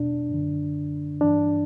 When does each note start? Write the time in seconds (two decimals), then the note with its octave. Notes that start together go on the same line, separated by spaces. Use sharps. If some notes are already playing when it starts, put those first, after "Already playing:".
Already playing: E2 B2 D4
0.30 F#2 D3
1.21 G2 E3 D4